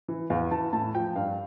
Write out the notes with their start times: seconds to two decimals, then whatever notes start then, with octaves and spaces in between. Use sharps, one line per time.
0.08 E3
0.30 E2 F5
0.51 E3 A5
0.73 A2 A5
0.95 F3 G5
1.16 G2 F5